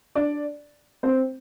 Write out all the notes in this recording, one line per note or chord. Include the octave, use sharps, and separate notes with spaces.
D4 D5
C4 C5